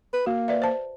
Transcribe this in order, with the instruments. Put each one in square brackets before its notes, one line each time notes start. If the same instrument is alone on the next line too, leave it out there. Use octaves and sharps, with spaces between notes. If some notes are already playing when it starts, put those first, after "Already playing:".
[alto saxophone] B4
[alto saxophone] A#3 [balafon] F#4
[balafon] B4 D5 E5
C5 A5